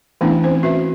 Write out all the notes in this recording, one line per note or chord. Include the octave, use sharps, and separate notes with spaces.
E3 A3 B3 C#4 D4 E4
C4 C#4 C5
F#4 B4 E5